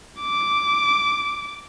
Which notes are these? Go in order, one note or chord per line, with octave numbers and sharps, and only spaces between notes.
D6